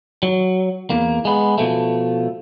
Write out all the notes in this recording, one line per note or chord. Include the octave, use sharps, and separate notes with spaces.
F#3
E2 A#3
G#3 B3
B2 F3 A3